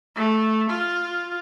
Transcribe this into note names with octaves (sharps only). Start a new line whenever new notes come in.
A3
F4